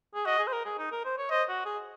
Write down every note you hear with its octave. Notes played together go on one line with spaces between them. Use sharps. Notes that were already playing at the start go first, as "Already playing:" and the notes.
G#4
F#4 D#5
G#4
C5
A#4
G#4
D#4
A#4
C5
C#5
C5 D#5
F#4
G#4